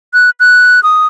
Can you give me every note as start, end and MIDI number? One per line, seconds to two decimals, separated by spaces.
0.14 0.30 90
0.40 0.83 90
0.83 1.07 87